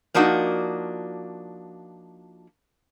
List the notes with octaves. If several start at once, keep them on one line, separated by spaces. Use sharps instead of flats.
F3 A#3 D4 D#4 F#4